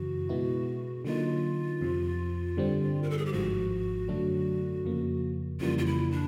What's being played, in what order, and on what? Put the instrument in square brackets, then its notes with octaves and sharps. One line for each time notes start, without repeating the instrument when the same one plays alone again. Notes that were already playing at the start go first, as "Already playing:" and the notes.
Already playing: [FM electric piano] F#2 C#3 E3 [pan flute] F#4
[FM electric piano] B2 G#3 B3 E4
[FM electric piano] D3 F#3 A#3 D#4 [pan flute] F4
[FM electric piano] F2 C3 F3
G2 D3 G3 C4
[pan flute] A#4
A4
G#4
G4
[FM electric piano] G#1 G#2 F3 [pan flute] F#4
[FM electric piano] F#2 D3 F#3 A3 D4
F2 C#3 F3 A#3
[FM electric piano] F2 C#3 E3 G3 A#3 [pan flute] F4
[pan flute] F4
E4
D4